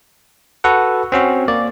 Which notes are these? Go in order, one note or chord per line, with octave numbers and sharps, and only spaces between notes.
F#4 A4 B4 F#5
C4 C#4 F#4
A#3 D5